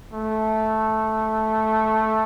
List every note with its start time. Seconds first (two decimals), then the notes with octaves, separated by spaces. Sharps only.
0.13 A3